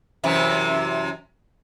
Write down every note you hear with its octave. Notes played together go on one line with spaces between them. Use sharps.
F#2 C3 E3